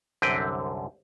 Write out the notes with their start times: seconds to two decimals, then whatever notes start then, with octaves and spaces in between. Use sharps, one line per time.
0.22 C2 F#2 D3 C4 B4 G5